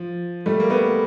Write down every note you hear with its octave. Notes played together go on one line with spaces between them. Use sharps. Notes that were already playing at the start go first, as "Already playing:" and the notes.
Already playing: F3
G3 A3
A#3
A3 B3